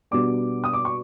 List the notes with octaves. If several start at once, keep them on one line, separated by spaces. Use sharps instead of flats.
B2 G3 B3 D4 D6
D#6
D6
C#6